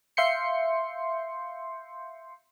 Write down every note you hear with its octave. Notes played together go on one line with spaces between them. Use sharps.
E5 F5 C6 G6 C7 C#7